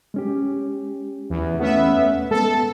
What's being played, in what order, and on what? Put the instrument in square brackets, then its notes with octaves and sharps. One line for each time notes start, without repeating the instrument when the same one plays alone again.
[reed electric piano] G#3 C#4 G4
[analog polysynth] E2
[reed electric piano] E2 A3 C#4 [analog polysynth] B3 E5
[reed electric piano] G#3 B3 [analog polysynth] A4